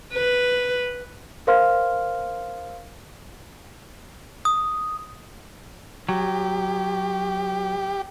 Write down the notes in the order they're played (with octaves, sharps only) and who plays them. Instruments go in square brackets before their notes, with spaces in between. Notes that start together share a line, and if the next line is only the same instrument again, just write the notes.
[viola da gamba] B4
[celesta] A#4 C5 F5 C6 F6
[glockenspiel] D#6
[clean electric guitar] F#3 [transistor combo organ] G4